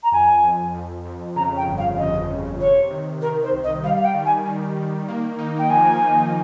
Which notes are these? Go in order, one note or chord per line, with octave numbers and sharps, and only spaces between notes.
A#5
F2 G#5
F2
F2
F2
C#3 A#5
G5
G1
F5
F2 D#5
F2
C3 C#5
D#3
D#3 A#4
C5
C2
D#5
G3 F5
F5
G5
D#3
G#5
D#3
D#3
A#3
D#4
G5
F3 G#5
F3